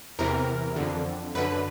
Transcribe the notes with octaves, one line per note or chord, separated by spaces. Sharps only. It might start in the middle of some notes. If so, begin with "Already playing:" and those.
E2 C3 E3 A#4
F2 D3
F#2 D3 B4